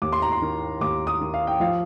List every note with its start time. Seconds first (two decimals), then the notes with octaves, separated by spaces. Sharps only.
0.02 D#2 D6
0.12 C6
0.22 A#5
0.32 C6
0.42 D#3
0.81 D#2 D6
1.07 D#6
1.21 D#3
1.34 F5
1.47 G5
1.60 F3 F5